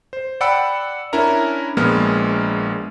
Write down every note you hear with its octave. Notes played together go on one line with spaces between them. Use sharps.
C5
D5 F#5 G5 B5 E6 C#7
C#4 D4 E4 A#4 A#5
A#1 G#3 A#3 B3 F6